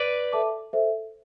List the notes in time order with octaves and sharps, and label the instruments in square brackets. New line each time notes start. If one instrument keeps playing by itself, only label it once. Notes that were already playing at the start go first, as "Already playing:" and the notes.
Already playing: [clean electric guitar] B4 D5
[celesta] A4 E5 A5 D6
A4 C5 E5